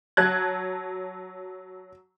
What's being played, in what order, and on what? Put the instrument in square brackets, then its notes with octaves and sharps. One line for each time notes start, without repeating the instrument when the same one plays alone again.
[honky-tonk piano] F#3 A5 F#6 G#6